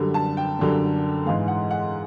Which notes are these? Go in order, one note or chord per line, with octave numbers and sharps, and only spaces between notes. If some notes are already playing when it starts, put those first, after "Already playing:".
Already playing: F#2 D3 G3
A5
G5
F#2 D3 G3
G#2 E3 G#3 F5
F#5
F#5